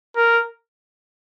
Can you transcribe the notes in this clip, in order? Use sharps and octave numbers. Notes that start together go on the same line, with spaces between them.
A#4